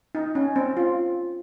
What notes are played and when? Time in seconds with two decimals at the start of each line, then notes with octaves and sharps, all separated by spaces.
0.15 D#4
0.35 C#4
0.56 C4
0.77 F4